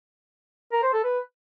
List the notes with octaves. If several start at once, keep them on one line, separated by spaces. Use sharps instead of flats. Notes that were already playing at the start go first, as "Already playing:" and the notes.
A#4
C5
A4
B4